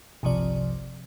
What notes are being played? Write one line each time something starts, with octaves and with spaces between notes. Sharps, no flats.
G1 C2 C3 F3 D5